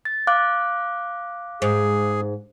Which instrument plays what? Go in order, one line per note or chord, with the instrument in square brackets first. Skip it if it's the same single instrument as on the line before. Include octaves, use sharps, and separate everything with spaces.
[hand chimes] A6
F5 D6 F#6
[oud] G#2 [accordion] G#4